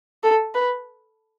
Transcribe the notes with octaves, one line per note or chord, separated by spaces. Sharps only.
A4
B4